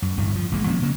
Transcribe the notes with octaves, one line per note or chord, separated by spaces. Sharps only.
F#2
D1 G2 E3
F3
A1 A#2 F#3 G#3
F3 A#3 B3 C#4
C#3 A#3